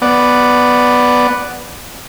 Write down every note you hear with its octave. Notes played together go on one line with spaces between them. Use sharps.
B3 D5